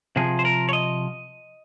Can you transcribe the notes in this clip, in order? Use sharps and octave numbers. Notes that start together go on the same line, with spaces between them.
C3 F3 G#4
C5
A#4
C#5
D#5